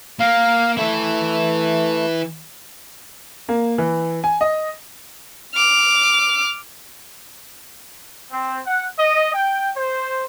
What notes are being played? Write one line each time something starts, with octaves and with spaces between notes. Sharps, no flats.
A#3 F5
E3 A3 E4
A#3
E3
G#5
D#5
D6 F6
C4
F#5
D#5
G5
C5